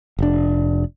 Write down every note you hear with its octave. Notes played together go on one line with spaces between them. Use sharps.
F1 D4